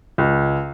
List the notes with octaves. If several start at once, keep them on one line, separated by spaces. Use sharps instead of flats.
C#2